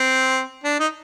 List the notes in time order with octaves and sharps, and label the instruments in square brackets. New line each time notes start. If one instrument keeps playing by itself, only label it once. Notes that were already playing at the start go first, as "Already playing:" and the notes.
Already playing: [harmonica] C4
D4
D#4